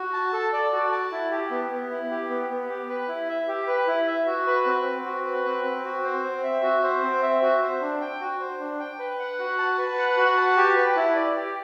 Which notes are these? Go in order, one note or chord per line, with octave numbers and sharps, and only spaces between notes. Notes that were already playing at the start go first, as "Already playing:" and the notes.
Already playing: F#4
A5
A4
D5
F#4
A5
E4
G4
B3
B3
E4
G4
B3
B3
G4
B4
E4
E5
G4
B4
E4
E5
F#4
B4
C4
C4
F#4
B4
C4
C4
F#4
C5
C4
E5
F#4
C5
C4
E5
F#4
C5
D4
G5
F#4
C5
D4
G5
B4
F#5
F#4
A5
B4
F#5
F#4
A5
G4
B4
E4
D5
G4